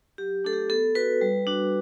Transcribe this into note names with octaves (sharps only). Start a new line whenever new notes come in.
F#3 G4
A3 D4 A4
G4
B3 A4
F#4 B4
G3
D4 F#4